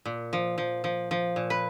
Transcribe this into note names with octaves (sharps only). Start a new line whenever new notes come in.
A#2
F3
F3
F3
F3
A#2
B4